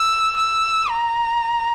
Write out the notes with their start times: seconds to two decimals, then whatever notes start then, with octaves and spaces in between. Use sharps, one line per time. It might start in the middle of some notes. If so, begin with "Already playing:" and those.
Already playing: E6
0.36 E6
0.89 A#5